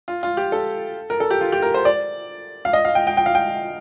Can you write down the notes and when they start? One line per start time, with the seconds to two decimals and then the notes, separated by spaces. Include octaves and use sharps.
0.08 F4
0.23 F4
0.37 G4
0.52 A4
1.10 A#4
1.20 A4
1.31 G4
1.41 F4
1.52 G4
1.62 A#4
1.74 C5
1.85 D5
2.65 F5
2.73 D#5
2.85 F5
2.95 G5
3.07 G5
3.17 G5
3.26 F5
3.35 G5